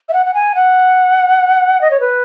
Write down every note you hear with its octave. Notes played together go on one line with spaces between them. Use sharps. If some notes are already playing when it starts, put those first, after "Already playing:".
E5
F#5
F#5
G#5
F#5
D#5
C#5
B4